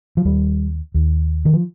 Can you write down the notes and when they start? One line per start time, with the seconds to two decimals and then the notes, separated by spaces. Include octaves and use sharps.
0.17 F3
0.25 D#2 G3
0.94 D#2
1.45 D#3
1.53 F3